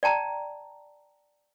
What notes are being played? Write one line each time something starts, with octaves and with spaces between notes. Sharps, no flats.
D5 G5 A5 A#5